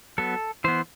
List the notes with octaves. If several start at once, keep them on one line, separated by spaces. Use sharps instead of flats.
F#3 B3 A4
E3 B3 C5